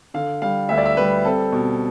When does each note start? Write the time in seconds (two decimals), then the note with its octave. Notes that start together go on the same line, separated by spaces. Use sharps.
0.14 D3 F5
0.42 G3 F5
0.69 D2 E5
0.78 D5
0.86 E5
0.97 G3 B4
1.24 C4 A4
1.52 B2